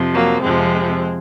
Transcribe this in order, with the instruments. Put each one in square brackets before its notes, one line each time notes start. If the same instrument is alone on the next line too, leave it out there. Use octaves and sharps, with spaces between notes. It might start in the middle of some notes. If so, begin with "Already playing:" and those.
Already playing: [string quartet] F2 C3 F3
F#3 A#3
F2 C3 F3 G#3 C4